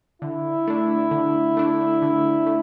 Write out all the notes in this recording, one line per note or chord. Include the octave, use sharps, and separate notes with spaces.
D3 E4
A3 D4
D3
A3 D4
D3
A3